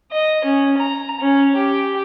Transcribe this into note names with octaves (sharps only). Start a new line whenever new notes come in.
D#5
C#4
A#5
C#4
G4